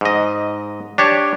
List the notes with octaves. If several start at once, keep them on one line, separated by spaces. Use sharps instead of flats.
G#2 D#5
D4 G4 C#5